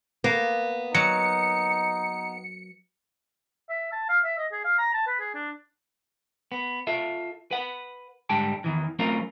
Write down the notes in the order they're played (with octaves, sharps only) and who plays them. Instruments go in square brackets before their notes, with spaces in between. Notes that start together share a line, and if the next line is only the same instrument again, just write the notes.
[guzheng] A#3 [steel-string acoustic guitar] B3
[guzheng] F#3 [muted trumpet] D#4 [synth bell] C#7
[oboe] E5
A5
F5
E5
D#5
G#4
F5
A#5
A5
B4
G#4
D4
[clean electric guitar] B3
F4 A4 E5
B4 F#5
G#2 D3 G3 G5 A5
E2 D#3 E3
F#3 A3 C4 C#4 F4 A#4